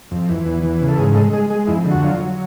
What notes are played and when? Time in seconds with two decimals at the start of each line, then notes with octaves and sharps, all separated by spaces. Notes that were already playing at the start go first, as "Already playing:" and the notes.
0.11 F2
0.29 E3
0.46 E2
0.63 E3
0.81 C#3
0.88 A4
0.98 G#2 G#4
1.15 G#3 A4
1.33 G#3 G#4
1.50 G#3 G#4
1.67 F2 E4
1.85 D3
1.91 F#4
2.03 F#3 F4
2.20 F#3